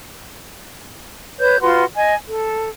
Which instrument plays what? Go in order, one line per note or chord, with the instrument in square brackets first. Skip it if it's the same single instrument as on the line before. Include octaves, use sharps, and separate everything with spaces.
[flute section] B4 C#5 G6
F4 F#4 B4 C6
D#5 G#5
A4